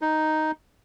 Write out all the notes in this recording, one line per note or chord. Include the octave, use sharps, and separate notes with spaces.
D#4